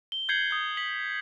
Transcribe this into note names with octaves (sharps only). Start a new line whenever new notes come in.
G7
G6 G#6 C7 C#7 F#7
D#6 G6
B6 F#7